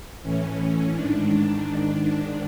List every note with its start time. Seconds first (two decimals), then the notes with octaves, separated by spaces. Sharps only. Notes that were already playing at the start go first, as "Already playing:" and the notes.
0.22 A2 E3 C#4
0.92 G#2 D#3 D4